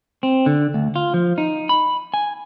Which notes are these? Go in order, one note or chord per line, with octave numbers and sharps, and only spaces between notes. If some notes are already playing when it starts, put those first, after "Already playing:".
C4
D3
D2
F4
F3
D#4
B5
G#5